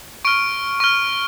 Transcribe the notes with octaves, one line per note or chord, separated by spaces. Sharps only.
C#6 F6 D7
C#6 F6